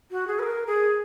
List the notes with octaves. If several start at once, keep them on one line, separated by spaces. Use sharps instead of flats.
F#4
G#4
B4
A#4
G#4